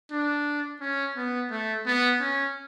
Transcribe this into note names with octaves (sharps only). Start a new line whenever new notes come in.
D4
C#4
B3
A3
B3
C#4